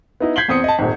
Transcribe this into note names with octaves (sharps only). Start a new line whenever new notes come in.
B3 D#4 E4
G6 G#6 B6 C7 F#7 G7
E2 C4 D#6 C#7
D#5 A5
D#1 G#1